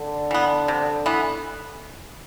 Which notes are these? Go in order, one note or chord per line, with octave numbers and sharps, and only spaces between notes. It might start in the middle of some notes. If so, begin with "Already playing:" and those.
Already playing: D3
E3 B3
C3
E3 B3